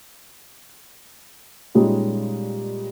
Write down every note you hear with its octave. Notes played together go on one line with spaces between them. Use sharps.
A#2 G3 G#3 C#4 D#4